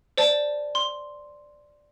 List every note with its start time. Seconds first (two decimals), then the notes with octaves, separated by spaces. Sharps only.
0.18 C5 D5 A5
0.75 C6